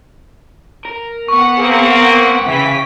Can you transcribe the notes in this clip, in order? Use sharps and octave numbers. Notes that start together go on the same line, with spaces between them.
A#4
B3 F#5 C#6
A#3 C4 G#4
G5
C#3 E3 B6